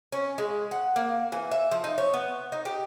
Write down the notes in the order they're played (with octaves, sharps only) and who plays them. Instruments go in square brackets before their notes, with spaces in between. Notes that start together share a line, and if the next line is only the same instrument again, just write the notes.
[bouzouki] C#4
G#3
F#5
A#3
E3
E5
F3
D#4
C#5
B3
D#4
G4